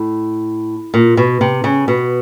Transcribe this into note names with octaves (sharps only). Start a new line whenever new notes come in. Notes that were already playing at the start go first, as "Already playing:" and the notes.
Already playing: A2
A#2
B2
C3
C#3
B2